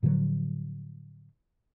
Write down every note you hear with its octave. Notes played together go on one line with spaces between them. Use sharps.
A2 D3 F3 F#3